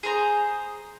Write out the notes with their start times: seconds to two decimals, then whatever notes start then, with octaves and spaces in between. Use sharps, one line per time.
0.03 G#4 C5 A#5